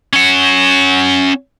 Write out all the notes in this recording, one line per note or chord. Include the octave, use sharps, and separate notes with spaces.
C#4 F#5